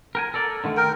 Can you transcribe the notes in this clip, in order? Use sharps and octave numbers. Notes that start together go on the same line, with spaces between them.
A#4 G5 G#5
A4 A#4 D5
D3 D#3 A3
A#4 G5